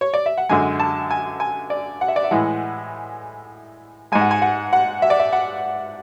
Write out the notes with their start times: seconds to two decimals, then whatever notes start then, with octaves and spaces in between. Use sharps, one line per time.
0.01 C#5
0.14 D5
0.26 E5
0.38 F#5
0.49 F#2 D3 G#3 G#5
0.80 A5
1.11 G#5
1.40 G#5
1.70 D5
2.01 F#5
2.08 E5
2.16 D5
2.24 E5
2.31 A2 E3 G#3 F#5
4.12 G#2 G#3 G#5
4.21 F#5
4.31 G#5
4.42 F#5
4.73 F#5
5.02 E5
5.10 D5
5.19 E5
5.33 F#5